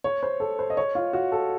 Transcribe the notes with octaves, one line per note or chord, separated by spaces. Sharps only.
C#5
C5
A4
C5
D#5
C#5
F4
F#4
A4